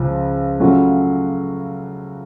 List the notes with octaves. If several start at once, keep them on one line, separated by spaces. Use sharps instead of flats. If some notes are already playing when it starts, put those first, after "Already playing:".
Already playing: C#2 C#3 F3
C#3 F#3 A3 C#4 F4